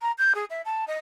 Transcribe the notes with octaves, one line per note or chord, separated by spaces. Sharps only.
A#5
G6
G#4
E5
A5
D#5